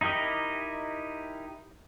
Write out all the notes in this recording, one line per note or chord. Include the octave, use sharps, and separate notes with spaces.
D#4 E4 G4 A#4 D#5